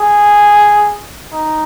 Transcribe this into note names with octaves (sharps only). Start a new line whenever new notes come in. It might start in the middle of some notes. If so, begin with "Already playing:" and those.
Already playing: G#4
D#4